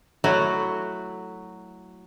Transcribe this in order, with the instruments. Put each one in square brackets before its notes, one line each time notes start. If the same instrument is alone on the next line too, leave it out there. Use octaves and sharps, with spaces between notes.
[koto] F#3 A3 E4 F#4